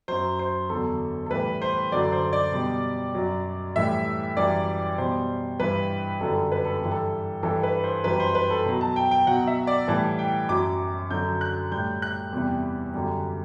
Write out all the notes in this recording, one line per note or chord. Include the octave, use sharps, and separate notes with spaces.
F#2 F#3 C5
C5
E2 D3 F#3 A4
A4
A2 E3 G3 B4
C5
F#2 D3 F#3 D5
C5
D5
B2 G3
F#2 F#3
A2 E3 G3 E5
F#2 E3 G3 D5
B2 G3 C5
G2 E3 G3 B4
F#2 D3 G3 A4
B4
A4
G2 E3 G3
A4
G2 E3 G3 A4
B4
C5
F#2 E3 G3 B4
C5
B4
A4
B2 F#3
A5
G5
G5
B2 F#3 F#5
E5
D5
A2 E3 G3 A5
G5
F#2 F#3 D6
F#2 D3 F#3 G6
F#6
A2 G3 G6
F#6
E2 C3 E3 G3
F#2 D3 G3